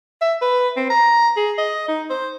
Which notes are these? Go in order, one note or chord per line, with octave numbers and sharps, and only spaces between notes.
E5
B4
C4
A#5
G#4
D#5
D#4
C5